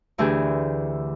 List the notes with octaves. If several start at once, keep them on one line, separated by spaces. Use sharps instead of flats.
D2 D3 E3 G4 G#4